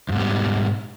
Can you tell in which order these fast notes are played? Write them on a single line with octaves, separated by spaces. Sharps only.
E2 G#2 B2 G3